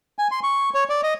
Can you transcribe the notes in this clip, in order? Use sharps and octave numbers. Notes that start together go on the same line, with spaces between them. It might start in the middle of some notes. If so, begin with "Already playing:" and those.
G#5
C6
C#6
C#5
D5
D#5